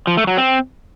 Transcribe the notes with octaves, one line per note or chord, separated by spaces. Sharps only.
F3
A3
F#3
C4